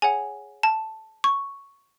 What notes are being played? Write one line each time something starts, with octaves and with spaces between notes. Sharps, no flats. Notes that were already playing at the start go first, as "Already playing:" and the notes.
G#4 C#5 F#5 G#5
A5
C#6